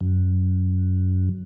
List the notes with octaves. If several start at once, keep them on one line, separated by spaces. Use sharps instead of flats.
F#2